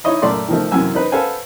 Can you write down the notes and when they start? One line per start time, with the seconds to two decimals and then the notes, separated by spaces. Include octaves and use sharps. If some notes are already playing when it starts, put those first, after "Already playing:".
0.04 D#4 E4 C#5 D#5 B5
0.22 F#2 A#2 A3 D5 C6
0.48 D#3 F3 A3
0.72 F#2 C3 E3 F#3 G#5 E6
0.94 D#4 B4 C5
1.12 A4 B4 C5 F5 F#5 G#5